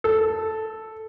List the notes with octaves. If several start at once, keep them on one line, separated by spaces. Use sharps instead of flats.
A4